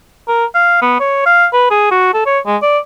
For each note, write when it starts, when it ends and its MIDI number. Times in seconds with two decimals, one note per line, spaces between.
0.28 0.45 70
0.54 0.77 77
0.82 0.95 59
1.00 1.25 73
1.26 1.46 77
1.52 1.65 71
1.71 1.89 68
1.91 2.11 66
2.13 2.24 69
2.26 2.39 73
2.46 2.56 56
2.62 2.78 74